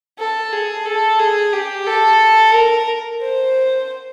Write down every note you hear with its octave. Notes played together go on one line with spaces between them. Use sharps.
A4
G#4
A4
G#4
G4
A4
A#4
C5